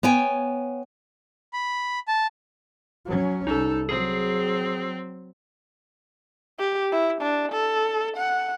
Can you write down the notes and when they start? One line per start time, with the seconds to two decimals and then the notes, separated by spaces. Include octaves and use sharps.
0.03 B3 C#5 G5 G#5
1.53 B5
2.08 A5
3.05 F#3 C#4
3.47 C2 D#4 A4
3.89 F#3 C4 G#4
6.59 G4
6.92 E4
7.22 D4
7.53 A4
8.17 F#5